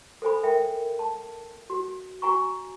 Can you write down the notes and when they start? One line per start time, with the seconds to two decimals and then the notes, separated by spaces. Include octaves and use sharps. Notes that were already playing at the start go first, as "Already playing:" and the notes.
0.22 A4 C5 G#5 B5
0.43 A#4 E5 G5
0.99 A5
1.70 F#4
2.22 F#4 G#5 A#5 C#6